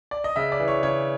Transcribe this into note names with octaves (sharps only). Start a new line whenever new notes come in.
D5
D#5
C#3 E5
D5
E3
C#5
C#3 C#5